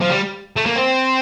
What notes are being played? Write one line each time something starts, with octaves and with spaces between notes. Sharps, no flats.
F3
G3
A3
A#3
C4